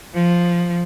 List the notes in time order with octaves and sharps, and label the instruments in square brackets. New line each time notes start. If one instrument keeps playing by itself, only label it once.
[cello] F3